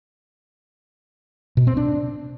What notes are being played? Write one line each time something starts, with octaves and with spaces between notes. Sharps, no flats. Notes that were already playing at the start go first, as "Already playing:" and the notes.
B2
C4
D4